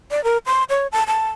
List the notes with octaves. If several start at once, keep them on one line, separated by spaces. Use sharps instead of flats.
D5
A#4
C6
C#5
A5
A5